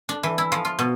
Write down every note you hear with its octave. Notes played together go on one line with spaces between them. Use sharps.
D4
E3
E4
F3
F4
B2